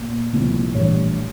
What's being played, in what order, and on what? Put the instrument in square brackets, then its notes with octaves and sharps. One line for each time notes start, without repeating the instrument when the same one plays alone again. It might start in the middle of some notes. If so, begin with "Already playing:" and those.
Already playing: [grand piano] A#2
C2 A#2 F3
A#1 A2 E3 G3 C#5